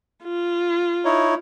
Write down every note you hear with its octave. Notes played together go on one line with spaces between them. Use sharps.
F4
D#4 E4 C#5